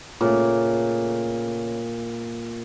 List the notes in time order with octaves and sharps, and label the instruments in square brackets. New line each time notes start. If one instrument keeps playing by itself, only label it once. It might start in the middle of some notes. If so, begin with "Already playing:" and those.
[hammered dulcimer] A#2 [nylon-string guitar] C#3 A3